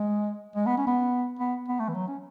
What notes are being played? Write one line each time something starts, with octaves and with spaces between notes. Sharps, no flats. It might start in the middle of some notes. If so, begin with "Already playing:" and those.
Already playing: G#3
G#3
B3
C#4
B3
B3
B3
A3
E3
F#3
C#4